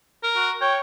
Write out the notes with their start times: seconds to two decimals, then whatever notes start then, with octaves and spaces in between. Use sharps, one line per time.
0.23 A#4
0.36 F#4
0.61 C#5 G5